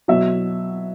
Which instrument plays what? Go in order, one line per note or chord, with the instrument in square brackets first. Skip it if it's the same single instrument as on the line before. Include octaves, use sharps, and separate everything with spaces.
[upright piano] B2 F#3 E5